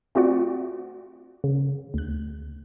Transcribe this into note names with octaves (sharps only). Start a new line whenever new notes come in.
A3 C4 F4 F#4 D5 F#5
C#3
D2 F#6